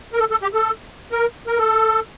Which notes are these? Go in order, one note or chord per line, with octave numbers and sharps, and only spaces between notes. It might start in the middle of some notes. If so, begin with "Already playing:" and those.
A#4
A4
A4
G4
A4
A#4
A#4
A4